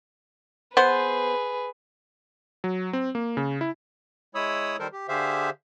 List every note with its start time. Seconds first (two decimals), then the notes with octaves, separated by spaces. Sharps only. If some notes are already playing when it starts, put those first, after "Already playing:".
0.77 B3 G#4 B4 C5
2.64 F#3
2.93 C4
3.15 A#3
3.37 C#3
3.61 E4
4.35 G#3 E4 C#5 B5 D#6 E6
4.79 D#3 G3 A4 A#4 C5
4.93 G4
5.08 D3 G4 G#4 C5 E5 F5